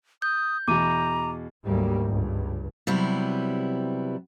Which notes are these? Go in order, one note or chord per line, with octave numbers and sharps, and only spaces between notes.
D#6 G6
E2 B2 A#5 D6 D#7
D2 G#2 F#3 G3 A#3
C#2 G2
C3 F#3 G3 B3 E4